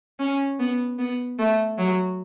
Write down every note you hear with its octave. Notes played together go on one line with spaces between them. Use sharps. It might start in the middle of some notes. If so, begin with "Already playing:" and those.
C#4
B3
B3
A3
F#3